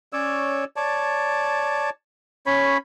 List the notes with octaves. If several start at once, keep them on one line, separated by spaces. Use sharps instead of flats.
C#4 C#5 D5 E6
C#5 D5 A5
C#4 C#5 B5